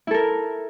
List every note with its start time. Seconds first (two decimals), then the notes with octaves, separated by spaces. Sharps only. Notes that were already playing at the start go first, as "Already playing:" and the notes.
0.07 E4
0.11 A4
0.14 A#4